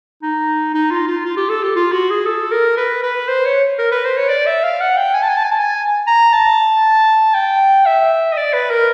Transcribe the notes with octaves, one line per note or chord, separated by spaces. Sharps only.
D#4
D#4
F4
F4
F4
G4
A4
G4
F4
F#4
G#4
A4
A#4
B4
B4
C5
C#5
A#4
B4
C5
C#5
D5
E5
F5
F#5
G5
G#5
A5
G#5
A5
G#5
A5
G#5
A#5
A5
G5
E5
D#5
D5
B4
A#4